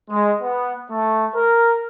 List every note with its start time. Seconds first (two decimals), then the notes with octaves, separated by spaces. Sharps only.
0.11 G#3
0.42 B3
0.91 A3
1.35 A#4